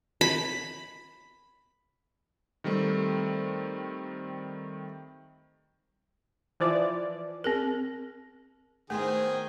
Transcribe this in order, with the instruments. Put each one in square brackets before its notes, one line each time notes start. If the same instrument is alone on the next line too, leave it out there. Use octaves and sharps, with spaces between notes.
[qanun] B5
[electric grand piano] D#3 G3 A3 C4
[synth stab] E3 F3 D5
[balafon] C4 G#4 A#4
[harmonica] D#3 G#4 G5 [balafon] A3 [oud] B3 C4 E4